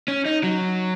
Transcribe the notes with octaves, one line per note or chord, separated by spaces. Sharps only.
C#4
D#4
F#3